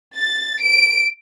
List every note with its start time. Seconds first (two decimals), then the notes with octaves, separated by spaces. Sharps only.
0.16 A6
0.61 D7